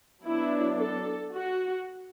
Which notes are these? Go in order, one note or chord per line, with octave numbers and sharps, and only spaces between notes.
F#3 B3 D4 E4
A4
F#4